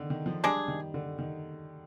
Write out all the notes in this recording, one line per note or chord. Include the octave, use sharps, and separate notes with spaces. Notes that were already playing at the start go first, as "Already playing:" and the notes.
Already playing: D3 D#3
D#3
F3
G3 G#3 D4 G#4
D#3
D3
D#3